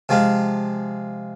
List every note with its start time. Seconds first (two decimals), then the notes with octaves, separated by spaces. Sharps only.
0.09 C3 F3 G#3